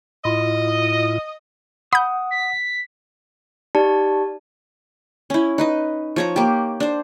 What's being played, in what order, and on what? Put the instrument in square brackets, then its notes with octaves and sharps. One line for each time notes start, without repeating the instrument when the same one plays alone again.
[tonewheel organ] A2 E4 F4 [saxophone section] D#5
[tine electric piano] F#5 [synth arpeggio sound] B5 G6 [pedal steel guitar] D#6
[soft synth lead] B6
[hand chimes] D#4 G4 D5 A5
[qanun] C#4 E4
D#4 B4 D#5
F3 C#5 A#5
A#3 G4
D4 C5